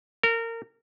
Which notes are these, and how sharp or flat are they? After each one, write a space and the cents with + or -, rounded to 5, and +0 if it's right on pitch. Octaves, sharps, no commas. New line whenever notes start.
A#4 -25